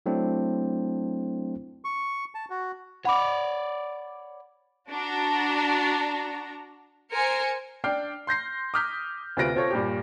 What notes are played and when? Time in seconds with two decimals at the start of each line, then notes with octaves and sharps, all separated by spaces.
0.06 F#3 A3 C4 D4 E4
1.85 C#6
2.35 A5
2.50 F#4
3.05 C#5 D5 F#5 B5 D6
4.91 D4 F#4 A#5
7.14 A#4 C5 G#5 C#7
7.84 D4 D5 G5 F6 C7
8.27 C6 G6 A#6 C7
8.74 D6 D#6 F6 G6 B6
9.37 D2 C3 F4 B4 A#6 D7
9.55 C4 F4 A4 C#5
9.71 G2 A#2 G4